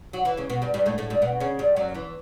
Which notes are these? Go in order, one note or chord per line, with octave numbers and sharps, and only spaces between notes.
F#3 F#4
E3 E4
C#3 C#4
B2 B3
G2 G3
G2 G3
A2 A3
A2 A3
G2 G3
B2 B3
C#3 C#4
G2 G3
F#2 F#3
E2 E3